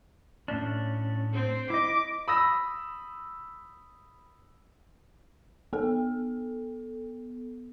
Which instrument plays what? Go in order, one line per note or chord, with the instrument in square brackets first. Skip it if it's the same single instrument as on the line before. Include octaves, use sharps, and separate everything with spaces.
[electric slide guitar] A2 C#4 D4
[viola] C4
[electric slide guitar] E4 D#5 [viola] D6
[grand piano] B5 D#6 E6 A#6
[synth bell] B3 A4